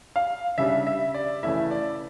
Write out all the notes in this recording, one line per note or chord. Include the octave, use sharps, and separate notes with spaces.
F5
C#3 G3 D4 E5
E5
D5
C#3 E3 A3 C#4 E4 E5
D5